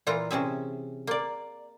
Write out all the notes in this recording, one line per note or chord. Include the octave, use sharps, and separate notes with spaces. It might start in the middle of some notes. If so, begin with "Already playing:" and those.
A#2 E3 F4 A#5
C3 C#4 G#4 E5
A#3 D5